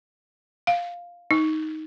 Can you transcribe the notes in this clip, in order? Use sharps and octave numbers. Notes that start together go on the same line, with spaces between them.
F5
D#4